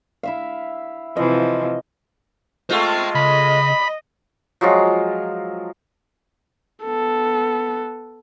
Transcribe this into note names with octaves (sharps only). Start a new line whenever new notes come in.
E4 E5 F5
C3 E3 F3 D#5
G#3 A3 F4 C5 G5
C#3 D#5 B5
F3 F#3 G#3 F4
B3 A4